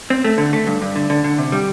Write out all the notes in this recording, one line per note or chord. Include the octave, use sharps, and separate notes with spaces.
C4
A3
D3
A3
G2
G2
D3
D3
D3
C3
G3